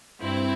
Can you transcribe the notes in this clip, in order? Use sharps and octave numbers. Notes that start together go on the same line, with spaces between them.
G2 C4 E4